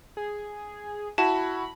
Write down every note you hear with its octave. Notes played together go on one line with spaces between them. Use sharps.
G#4
E4 F#4 A5 B5